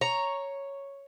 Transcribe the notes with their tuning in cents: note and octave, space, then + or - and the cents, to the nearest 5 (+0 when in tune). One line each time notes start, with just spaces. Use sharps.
C#5 +0 A#5 +0